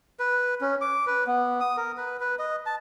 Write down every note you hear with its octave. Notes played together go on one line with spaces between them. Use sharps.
B4
C#4
D6
B4
B3
D#6
A#4
B4
B4
D#5
A5